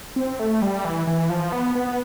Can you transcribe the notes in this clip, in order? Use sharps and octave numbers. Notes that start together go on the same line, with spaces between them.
C4
A3
G3
E3
E3
F3
B3
B3